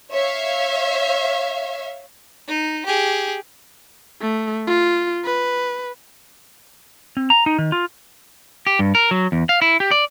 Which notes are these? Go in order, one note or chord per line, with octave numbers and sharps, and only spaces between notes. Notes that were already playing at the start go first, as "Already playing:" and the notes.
C#5 E5 F5
D#4
G4 G#4
A3
F4
B4
C4
A#5
D#4
D#3
F4
G4
G2
A#4
F#3
E2
F5
E4
G4
D5